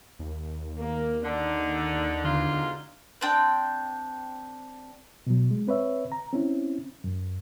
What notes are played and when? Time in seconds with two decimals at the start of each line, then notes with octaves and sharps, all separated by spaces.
0.19 D#2
0.81 A#3
1.24 D3 D4 D#4
2.24 G#2 B2 D3 F4
3.21 C4 D4 G5
5.27 B2 F#3
5.51 G#3
5.68 C4 B4 C#5 E5
6.12 A#5
6.33 C4 C#4 E4
7.04 F#2